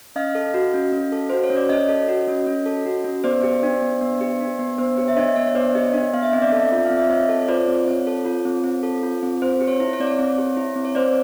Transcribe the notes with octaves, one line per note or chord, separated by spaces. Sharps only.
C#4 D#5 F5
A4
F#4
C#4
C#4
A4
F#4 C5
C#5
C#4
D5
C#4 C#5 D#5
A4
F#4
C#4
C#4
A4
F#4
C#4
B3 C5 D5
G4
D4
B3
B3
G4
D4
B3
B3 C5
G4 C#5
E5
D4 C#5 D#5
B3 C#5
C#5
B3 C5 D5
G4 C#5 D#5
D4
B3 F5
E5
C4 D#5
D5 E5
A4
F4
F5
C4
E5
C4 C#5 D#5
A4
C#5
F4 C5 D5
C4
C4 C#5
A4
F4
C4
C4
A4
F4
C4
C4 C5
G4
C#5
E4
C#5
C4 D5
C#5
C4
G4
E4
C4
C#5
C4 C5 D5